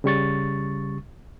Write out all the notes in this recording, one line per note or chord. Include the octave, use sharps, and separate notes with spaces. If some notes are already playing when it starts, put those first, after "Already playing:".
C#3 G3 C#6 A6